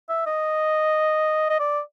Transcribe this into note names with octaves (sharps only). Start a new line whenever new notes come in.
E5
D#5
D#5
D5